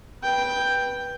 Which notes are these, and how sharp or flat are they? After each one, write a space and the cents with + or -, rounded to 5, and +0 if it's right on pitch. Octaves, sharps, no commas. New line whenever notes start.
B4 -15 G5 +5